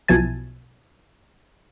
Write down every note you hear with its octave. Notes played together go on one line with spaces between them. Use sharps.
B1 B2 F3 E4 G#5 A5